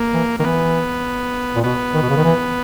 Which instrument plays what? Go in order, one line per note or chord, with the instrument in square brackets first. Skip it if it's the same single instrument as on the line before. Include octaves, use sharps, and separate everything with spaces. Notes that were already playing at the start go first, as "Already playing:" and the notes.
Already playing: [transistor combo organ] A#3
[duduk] E3
[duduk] D#3 [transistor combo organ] A#3
[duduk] E3 [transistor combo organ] B3
[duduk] A#2
[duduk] B2 [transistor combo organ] B3
[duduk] D#3
B2
C#3
D#3
E3